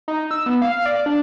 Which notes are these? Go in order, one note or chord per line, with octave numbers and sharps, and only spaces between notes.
D#4
E6
B3
F5
D5
D4